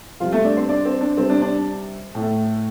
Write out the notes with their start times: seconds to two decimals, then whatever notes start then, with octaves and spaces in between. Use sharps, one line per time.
0.20 C3 F3 G3 F4
0.32 A3 A4
0.44 D4 D5
0.57 C4 C5
0.69 D4 D5
0.85 C4
1.01 D4
1.17 C3 G3 C4
1.30 D4
1.42 D4
2.15 A2 A3